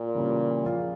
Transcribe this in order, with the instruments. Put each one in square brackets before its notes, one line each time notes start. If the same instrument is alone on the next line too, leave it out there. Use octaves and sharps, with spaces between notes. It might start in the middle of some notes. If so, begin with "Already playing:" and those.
Already playing: [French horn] A#2
[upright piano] C#3 E3 G3 A#3 C#4
F3 A#3 C#4 F4 G#4